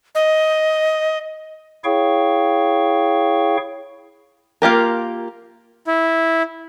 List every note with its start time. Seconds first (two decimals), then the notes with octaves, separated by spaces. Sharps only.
0.15 D#5
1.84 E4 G#4 C#5 F5 G5 C#6
4.62 A#3 F4 G4 A#4
5.87 E4